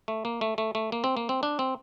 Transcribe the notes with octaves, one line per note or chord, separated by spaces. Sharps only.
A3
A#3
A3
A3
A3
A#3
C4
A#3
C4
D4
C4